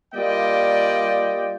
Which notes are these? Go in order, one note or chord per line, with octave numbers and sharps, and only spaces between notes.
G3 A#3 F4 D5 D#5 G5